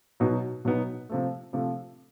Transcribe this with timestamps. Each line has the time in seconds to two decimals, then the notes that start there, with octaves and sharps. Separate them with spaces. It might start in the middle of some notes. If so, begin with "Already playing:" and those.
0.20 B2 F#3 B3 D#4
0.65 B2 F#3 B3 D#4
1.10 C3 F3 A3
1.53 C3 F3 A3